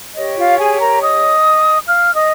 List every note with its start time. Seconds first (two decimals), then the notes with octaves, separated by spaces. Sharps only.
0.16 G4 C#5 D#5
0.37 F4 F5
0.58 G#4 G#5
0.80 A#4 A#5
1.01 D#5 D#6
1.86 F5 F6
2.15 D#5 D#6